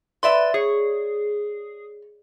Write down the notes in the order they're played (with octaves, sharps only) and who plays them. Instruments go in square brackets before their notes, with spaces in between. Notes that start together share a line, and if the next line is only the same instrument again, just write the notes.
[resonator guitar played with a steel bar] B4 D5 E5 [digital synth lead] C6
[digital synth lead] G#4 [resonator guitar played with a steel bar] C#5